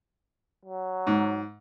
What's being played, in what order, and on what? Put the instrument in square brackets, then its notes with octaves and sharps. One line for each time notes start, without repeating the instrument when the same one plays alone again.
[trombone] F#3
[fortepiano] G#2